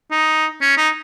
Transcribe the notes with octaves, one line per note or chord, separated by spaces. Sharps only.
D#4
C#4
D#4